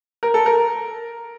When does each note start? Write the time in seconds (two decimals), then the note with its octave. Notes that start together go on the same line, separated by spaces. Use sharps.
0.23 A#4
0.34 A4
0.46 A#4